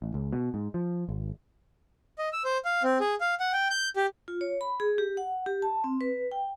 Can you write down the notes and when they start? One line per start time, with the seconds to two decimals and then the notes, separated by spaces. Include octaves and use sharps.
0.02 A1
0.14 C#2
0.32 B2
0.54 G#2
0.74 F3
1.09 G#1
2.19 D#5
2.33 E6
2.45 C5
2.65 F5
2.83 C4
3.00 G#4
3.21 F5
3.40 F#5
3.53 G5
3.71 G6
3.96 G4
4.28 F4
4.41 C#5
4.61 B5
4.80 G#4
4.98 G4
5.17 F#5
5.46 G4
5.62 A5
5.84 C4
6.01 B4
6.31 G5